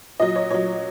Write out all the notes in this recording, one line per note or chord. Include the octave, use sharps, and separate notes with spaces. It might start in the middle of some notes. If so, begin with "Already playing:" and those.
A#2 F#3 D#5
C#5
A#2 F#3 C#5